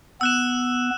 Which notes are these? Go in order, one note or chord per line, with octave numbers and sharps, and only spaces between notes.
B3 E6 F#6 E7